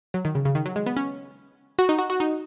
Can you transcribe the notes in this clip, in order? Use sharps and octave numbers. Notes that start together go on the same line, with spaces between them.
F#3
D#3
C#3
C#3
D#3
F#3
G#3
B3
C#4
F#4
D#4
F#4
F#4
D#4